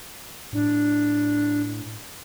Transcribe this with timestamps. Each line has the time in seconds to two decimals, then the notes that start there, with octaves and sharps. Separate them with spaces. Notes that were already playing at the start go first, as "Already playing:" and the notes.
0.53 A2 D4